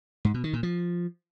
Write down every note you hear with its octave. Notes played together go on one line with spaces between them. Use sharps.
G#2
B2
D#3
A#2
F3